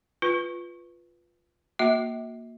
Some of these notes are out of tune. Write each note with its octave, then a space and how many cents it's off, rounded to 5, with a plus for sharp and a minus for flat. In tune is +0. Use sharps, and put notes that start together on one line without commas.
F4 +0 B4 +0
A#3 +0 F#4 -25 E5 -40